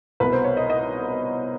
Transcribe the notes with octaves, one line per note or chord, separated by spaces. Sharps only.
C2 B2 B4
C5
C#5
D#5
D#5